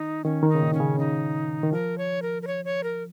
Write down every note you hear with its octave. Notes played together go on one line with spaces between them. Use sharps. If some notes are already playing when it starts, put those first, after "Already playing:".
Already playing: D#3 D#4
D#3 C#4
D#3
D#4
C#3
A#2
C#4
C#3
D#4
D#3
F3 A#4
C#5
A#4
A#4
C#5
C#5
A#4